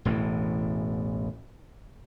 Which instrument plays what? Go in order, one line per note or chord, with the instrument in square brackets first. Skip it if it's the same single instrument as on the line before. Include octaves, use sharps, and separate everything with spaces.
[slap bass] E1 A1 A2 E3